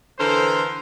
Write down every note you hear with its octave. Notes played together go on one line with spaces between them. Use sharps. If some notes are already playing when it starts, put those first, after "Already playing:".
D3 E3 A4 A#4 C5